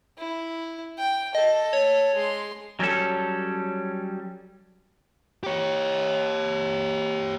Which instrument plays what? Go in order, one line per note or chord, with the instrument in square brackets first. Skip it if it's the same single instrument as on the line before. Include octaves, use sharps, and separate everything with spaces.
[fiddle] E4
G5
[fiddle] A4 [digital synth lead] D#5
[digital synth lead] C#5
[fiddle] G#3 C6
[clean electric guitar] F#3 G3 C#4 A4
[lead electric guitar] G4 C#5